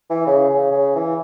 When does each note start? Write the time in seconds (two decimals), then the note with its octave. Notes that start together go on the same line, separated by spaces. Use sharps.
0.10 E3
0.27 C#3
0.49 C#3
0.72 C#3
0.95 E3